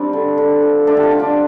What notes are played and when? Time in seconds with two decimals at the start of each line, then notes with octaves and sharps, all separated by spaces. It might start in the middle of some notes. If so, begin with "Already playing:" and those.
Already playing: G3 C4 D4
0.13 D3
0.38 D3
0.62 F3
0.87 A3 D4
0.97 G4
1.03 F4
1.11 D3
1.19 D4